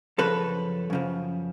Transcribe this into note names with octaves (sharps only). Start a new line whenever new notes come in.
F#2 C#3 F3 A4 B4
F#2 C#3 F3